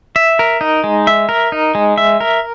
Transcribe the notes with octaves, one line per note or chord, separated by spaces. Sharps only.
E5
A#4
D#4
G#3
E5
A#4
D#4
G#3
E5
A#4